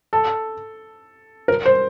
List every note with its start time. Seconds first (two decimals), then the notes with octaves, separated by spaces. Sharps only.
0.13 A4
1.48 A#4
1.66 C5